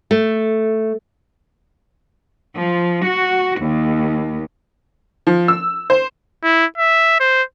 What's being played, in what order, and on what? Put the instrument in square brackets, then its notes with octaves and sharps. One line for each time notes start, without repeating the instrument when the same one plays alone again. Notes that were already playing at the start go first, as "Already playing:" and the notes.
[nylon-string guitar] A3
[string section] F3
F#4
D#2
[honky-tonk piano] F3
E6
C5
[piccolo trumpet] E4
E5
C5